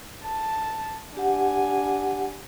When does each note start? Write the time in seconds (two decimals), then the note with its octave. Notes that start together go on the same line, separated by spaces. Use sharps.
0.24 A5
1.17 D4 G4 F#5 G#5